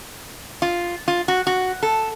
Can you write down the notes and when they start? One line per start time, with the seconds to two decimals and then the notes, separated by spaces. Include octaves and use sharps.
0.62 F4
1.08 F4
1.28 F#4
1.47 F#4
1.83 A4